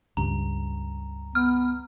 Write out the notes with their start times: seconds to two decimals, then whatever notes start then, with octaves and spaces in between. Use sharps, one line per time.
0.17 C#2 G2 A#5
1.35 B3 F6